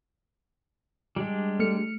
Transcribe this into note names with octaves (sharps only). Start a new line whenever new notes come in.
G3 G#3 D4
A3 F6 C#7